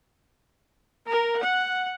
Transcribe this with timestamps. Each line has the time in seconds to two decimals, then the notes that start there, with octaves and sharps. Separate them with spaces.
1.08 A#4
1.39 F#5